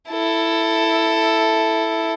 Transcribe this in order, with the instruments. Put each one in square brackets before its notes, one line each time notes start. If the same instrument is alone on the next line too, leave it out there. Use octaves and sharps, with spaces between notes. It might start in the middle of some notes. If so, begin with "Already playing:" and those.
[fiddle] E4 A4